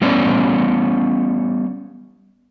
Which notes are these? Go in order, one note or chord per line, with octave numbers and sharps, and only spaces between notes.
G3 B3 C#4 C#5 D5